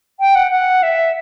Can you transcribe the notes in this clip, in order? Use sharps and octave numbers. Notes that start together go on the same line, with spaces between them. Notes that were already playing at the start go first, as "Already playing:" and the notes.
G5
F#5
F#5
E5